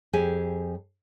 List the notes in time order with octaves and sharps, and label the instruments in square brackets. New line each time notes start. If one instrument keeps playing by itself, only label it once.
[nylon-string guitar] F2 G4 G#4 G#5